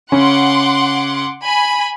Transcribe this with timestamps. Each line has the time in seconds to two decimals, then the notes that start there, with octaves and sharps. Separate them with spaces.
0.12 C#3 C#4 F#5 C6 D6
1.44 G#5 B5